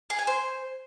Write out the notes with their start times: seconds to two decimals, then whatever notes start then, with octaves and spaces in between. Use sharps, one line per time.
0.10 G#4
0.19 G#5
0.27 C5